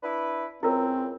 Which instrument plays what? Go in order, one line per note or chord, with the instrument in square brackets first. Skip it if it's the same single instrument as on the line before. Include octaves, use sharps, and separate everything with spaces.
[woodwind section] D4 E4 B4
[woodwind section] C#2 [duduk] C4 [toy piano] E4 F4 A#4